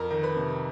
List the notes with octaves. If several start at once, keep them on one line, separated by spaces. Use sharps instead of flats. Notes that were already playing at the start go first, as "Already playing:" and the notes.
Already playing: F2 A#4 A#5
D#3
B4 B5
C3